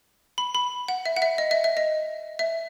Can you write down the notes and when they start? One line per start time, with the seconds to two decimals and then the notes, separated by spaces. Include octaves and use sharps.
0.38 B5
0.55 B5
0.88 F#5
1.06 E5
1.16 F#5
1.22 E5
1.38 D#5
1.51 E5
1.64 E5
1.77 D#5
2.39 E5